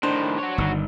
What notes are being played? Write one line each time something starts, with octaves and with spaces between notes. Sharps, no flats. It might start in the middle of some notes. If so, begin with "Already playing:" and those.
A2 D#3 D4 C5
F#4 C#5
G1 D#3